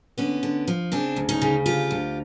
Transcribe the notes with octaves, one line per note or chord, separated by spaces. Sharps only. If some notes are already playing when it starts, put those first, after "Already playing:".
D3 B3 C#4
D3
F3
C#3 C4 D4
D2
C#4 D#4
C#3
D2 F4 G4
D2